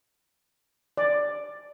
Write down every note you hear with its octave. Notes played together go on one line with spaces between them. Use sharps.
D5